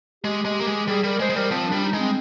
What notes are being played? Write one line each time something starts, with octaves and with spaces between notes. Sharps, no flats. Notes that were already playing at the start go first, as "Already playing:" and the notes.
G#3 G4
G#3
A#3
G#3
G3 G#4
G3 A#4
G#3 C5
G#3
G3 A#4
F3 C4
G3 D4
D#4
G#3
C4